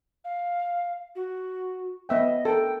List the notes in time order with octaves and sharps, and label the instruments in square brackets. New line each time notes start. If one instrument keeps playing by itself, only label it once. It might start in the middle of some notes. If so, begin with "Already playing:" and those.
[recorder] F5
F#4
[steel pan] B3 E5 G5 [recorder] D#5
[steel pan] A4 A#4 [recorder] G5